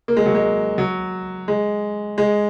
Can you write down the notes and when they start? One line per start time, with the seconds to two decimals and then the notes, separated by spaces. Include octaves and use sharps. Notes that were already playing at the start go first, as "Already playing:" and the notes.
0.08 A#3
0.17 G#3
0.26 F#3
0.35 G#3
0.78 F#3
1.48 G#3
2.18 G#3